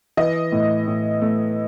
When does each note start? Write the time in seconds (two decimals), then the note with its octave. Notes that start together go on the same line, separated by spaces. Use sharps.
0.17 E3 D#5
0.52 A2
0.87 A2
1.22 A3